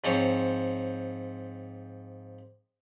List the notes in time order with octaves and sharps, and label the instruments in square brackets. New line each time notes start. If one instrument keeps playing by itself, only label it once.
[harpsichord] G#2 F3 C4 C#5